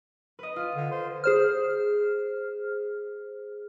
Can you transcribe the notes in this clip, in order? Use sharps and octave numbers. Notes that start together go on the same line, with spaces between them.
B4 D#5
F4
D3
C5
G#4 C5 F6